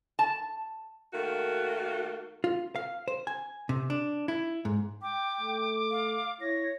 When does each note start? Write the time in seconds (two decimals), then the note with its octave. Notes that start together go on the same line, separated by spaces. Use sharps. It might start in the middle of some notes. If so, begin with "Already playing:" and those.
0.19 A5
1.12 D#3 A3 A#3 F#4
2.44 F4
2.76 F5
3.08 C5
3.27 G#5
3.69 C3
3.90 D4
4.28 E4
4.65 G#2
5.02 G5 D6
5.40 A3
5.91 F5
6.41 E4 C#5 A#6